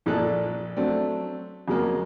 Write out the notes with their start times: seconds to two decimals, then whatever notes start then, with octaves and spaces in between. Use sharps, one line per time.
0.06 A#1 A#2 G#4 A4 D5 F#6
0.77 F#3 A3 C4 D4
1.68 F2 C#3 F#3 G#3 A#3